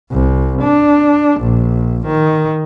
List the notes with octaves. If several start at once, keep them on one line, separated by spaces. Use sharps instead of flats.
C2
D4
A#1
D#3